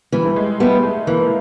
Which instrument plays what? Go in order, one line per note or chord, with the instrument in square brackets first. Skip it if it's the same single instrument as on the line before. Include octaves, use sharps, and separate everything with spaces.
[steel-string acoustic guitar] E3 [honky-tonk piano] G3
[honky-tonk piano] A3
G#3
[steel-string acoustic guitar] G3 B3 [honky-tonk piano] A3
[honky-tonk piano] A3
[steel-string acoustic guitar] E3 [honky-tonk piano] A#3